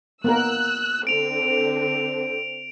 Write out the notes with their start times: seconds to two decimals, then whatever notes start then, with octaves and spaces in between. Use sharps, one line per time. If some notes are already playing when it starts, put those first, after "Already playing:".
0.24 A#3 B3 A#4 E6 F#6
1.07 D3 C4 D7 F7